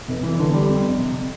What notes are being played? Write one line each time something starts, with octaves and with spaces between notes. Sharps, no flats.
F1
E3
D3
G3
F2
F2
C3